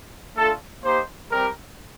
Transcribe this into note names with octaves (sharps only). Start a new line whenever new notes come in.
A3 D4 F4 A4
A#3 D#4 G4 C5
G3 C4 G4 A#4